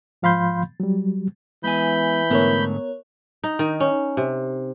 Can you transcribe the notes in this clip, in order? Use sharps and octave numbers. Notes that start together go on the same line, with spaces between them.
G#2 F3 F5 B5 C6 G6
F#3 G3
E3 G#3 B3 G#5 B5 G6
G#2 D3 A3 B3 A#4 C#5
D#4
D#3
C#4
C3